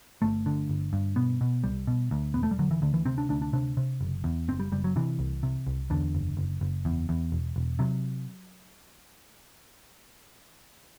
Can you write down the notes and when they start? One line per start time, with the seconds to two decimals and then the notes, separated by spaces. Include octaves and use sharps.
0.22 G1 A3
0.46 D3
0.69 G1
0.93 G2
1.16 B2 B3
1.41 B2
1.64 C2 G3
1.87 B2
2.11 D2
2.34 E1 B3
2.43 A3
2.51 G3
2.59 D3 F#3
2.71 E3
2.82 D2 D3
2.94 E3
3.06 C3 C4
3.18 D4
3.29 D2 D4
3.42 D4
3.53 C3 D4
3.77 C3
4.01 F#1
4.24 E2
4.48 F#1 C4
4.60 G3
4.72 F#1 G3
4.84 F#3
4.96 C3 E3
5.19 C2
5.43 C3
5.67 C2
5.90 E2 D3
6.15 F#1
6.37 F#1
6.61 F#1
6.85 E2
7.09 E2
7.32 E1
7.56 E1
7.79 C3 F#3